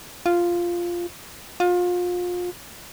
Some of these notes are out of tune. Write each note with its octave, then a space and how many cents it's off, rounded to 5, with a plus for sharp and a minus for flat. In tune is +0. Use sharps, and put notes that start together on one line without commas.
F4 -5
F4 +30